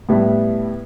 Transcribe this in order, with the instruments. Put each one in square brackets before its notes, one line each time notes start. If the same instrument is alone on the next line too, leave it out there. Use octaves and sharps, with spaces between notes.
[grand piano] A2 G3 B3 E4